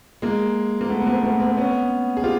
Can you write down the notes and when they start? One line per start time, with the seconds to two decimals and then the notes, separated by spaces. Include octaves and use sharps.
0.22 G#3 A#3
0.81 A#3
0.89 A3 B3
1.00 B3
1.07 A#3 C4
1.23 A3 B3
1.40 A#3 C4
1.57 B3 C#4
2.17 G#4
2.24 F4 G4